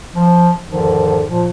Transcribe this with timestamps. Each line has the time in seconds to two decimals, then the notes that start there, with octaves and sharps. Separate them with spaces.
0.15 F3
0.69 E2 G#2 D3 D#3 F3
1.30 A#2 F3